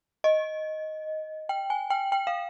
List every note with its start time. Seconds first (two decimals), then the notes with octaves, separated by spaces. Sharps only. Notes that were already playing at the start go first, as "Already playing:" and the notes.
0.24 D#5
1.49 G5
1.70 G#5
1.90 G5
2.12 G5
2.27 F5